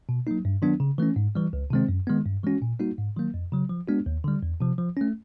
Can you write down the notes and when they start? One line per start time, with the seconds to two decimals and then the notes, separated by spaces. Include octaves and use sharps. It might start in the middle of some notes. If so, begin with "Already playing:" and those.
0.09 B2
0.27 F#3 A#3 D#4
0.45 G2
0.62 D#3 F#3 B3 D4
0.80 C#3
0.98 E3 A3 C#4
1.16 G#2
1.35 E3 G3
1.53 C#2
1.70 C3 D#3 G#3 C4
1.89 F#2
2.07 D#3 G#3 B3
2.26 G2
2.44 E3 G#3 C#4 F#4
2.62 A#2
2.80 G3 A#3 D#4 F#4
2.98 G#2
3.16 D#3 F#3 A#3
3.34 F2
3.52 C#3 F#3
3.69 F3
3.88 G#3 B3 D4 F#4
4.06 D#2
4.24 D3 G3
4.43 E2
4.61 C3 F3
4.78 F3
4.97 A3 C#4